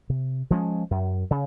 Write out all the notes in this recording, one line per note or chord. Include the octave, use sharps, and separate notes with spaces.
C3
F3 G#3 C#4
F#2
C#3